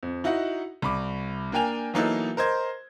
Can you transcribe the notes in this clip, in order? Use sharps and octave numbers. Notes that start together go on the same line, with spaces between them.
F2
D#4 E4 F#4 D#5 F#5
C2 B5 D6
A#3 D4 A#4 G5 G#5 F7
E3 F#3 A#3 B3 D#4 A4
A#4 C5 D#5 G#6